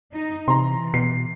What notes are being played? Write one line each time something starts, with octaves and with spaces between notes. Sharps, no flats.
D#4
C3 E3 A#5 C6
B2 C7